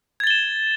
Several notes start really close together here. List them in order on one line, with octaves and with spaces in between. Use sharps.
G#6 A6 G7 E7